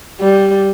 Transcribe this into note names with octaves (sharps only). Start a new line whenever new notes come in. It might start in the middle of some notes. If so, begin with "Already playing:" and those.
G3